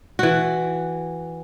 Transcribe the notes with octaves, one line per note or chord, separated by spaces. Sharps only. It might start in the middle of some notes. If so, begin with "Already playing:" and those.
E3 F#4